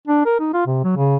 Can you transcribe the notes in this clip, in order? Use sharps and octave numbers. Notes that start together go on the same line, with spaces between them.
D4
A#4
D#4
F4
C3
F#3
C#3